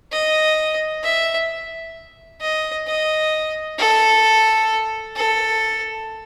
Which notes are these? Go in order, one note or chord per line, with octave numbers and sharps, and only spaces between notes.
D#5
E5
D#5
D#5
A4
A4